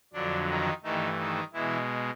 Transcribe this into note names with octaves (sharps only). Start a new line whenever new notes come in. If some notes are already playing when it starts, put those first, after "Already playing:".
F2 D3 F#3 D4
D#3 D#4
G2 D#3 E3 A3 D#4
D#3 D#4
B2 E3 G#3 E4